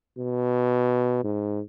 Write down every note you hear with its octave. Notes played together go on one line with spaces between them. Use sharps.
B2
G#2